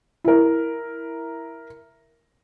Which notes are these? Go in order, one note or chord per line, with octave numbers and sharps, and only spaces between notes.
E4 A#4